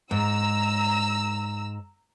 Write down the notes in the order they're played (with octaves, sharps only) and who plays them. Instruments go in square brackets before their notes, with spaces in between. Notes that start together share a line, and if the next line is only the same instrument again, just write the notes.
[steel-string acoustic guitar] G#2 [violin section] A#5 E6